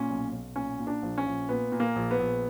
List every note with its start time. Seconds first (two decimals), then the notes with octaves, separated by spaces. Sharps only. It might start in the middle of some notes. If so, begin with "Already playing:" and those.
Already playing: A#2 C#4
0.10 B1
0.33 B1
0.55 A#2 C#4
0.79 A#2
0.87 D4
1.02 A#1
1.18 C#4
1.26 A#1
1.49 A#2 B3
1.72 A#2
1.80 A#3
1.96 A#1
2.11 B3
2.20 A#1